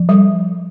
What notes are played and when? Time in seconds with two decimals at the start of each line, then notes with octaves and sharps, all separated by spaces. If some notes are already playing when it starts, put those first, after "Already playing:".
Already playing: F3
0.09 G3